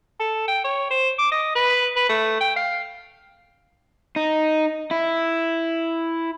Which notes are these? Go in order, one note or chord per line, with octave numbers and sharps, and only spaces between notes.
A4
G5
C#5
C5
D6
D#5
B4
B4
A3
G5
F5
D#4
E4